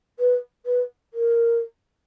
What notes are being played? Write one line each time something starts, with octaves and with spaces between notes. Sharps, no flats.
B4
B4
A#4